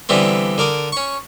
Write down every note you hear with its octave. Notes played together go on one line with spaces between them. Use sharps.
D3 E3 G3 B3 C4
D3 A#4 D5 D#6
C#4 C#6